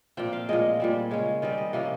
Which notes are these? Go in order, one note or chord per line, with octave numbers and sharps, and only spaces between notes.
A#2 F3 C4 G5
F5
A#2 F3 G#3 D#5
A#2 G3 C4
C#3 G#3 C#4
D#3 G3 C4 D#5
D#5
C3 F3 A#3 C#4 D#5